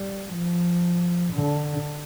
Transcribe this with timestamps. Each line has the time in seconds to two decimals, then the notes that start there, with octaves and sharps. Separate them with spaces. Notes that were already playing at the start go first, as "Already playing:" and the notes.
Already playing: G3
0.34 F3
1.33 D3